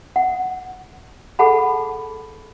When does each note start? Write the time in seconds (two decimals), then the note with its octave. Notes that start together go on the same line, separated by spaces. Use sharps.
0.16 F#5
1.39 G#4 A4 F#5 A5 B5